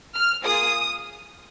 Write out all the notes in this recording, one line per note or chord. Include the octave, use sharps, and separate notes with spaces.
F6
A#3 F4 G#4 D#6